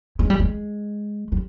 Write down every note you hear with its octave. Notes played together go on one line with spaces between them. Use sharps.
G#3
G3
G#3
G3